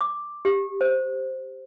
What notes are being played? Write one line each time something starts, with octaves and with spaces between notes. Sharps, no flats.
D6
G4
C5